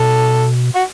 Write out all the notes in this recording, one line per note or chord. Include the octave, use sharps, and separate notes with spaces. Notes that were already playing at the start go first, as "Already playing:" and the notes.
Already playing: B2 A4
F#4